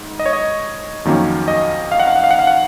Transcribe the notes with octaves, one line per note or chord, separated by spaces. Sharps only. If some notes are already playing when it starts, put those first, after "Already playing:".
Already playing: G#2
D#5
C#5
D#5
F2 D#3 F#3 A#3 C#4
D#5
F5
F#5
F5
F#5
F5
F#5
F5
F#5